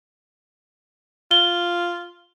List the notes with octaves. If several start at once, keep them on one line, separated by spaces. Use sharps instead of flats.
F4 G7